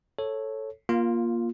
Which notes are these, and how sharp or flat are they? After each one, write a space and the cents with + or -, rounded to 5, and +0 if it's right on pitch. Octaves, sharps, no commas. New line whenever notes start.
A4 +0 C#5 -10
A#3 +20 F4 +0